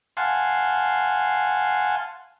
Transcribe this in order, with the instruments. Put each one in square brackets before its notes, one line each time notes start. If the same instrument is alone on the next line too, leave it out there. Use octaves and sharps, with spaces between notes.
[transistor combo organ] F5 F#5 G#5 A5 C6